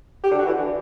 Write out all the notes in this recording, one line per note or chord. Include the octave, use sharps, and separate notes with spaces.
G4
D3
F#4
E3
D3